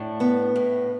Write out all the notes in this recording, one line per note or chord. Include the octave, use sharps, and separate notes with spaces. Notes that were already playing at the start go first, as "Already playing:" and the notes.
Already playing: A2 D4
B3
A2